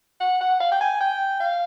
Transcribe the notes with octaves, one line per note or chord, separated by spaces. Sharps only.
F#5
F#5
F5
G5
G#5
G5
F5